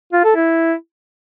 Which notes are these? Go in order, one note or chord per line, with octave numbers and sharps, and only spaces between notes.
F4
A4
E4